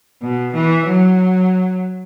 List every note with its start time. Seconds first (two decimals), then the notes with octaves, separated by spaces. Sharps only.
0.22 B2
0.54 E3
0.86 F#3